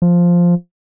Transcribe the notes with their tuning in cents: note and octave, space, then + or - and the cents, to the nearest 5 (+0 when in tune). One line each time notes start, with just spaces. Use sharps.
F3 +0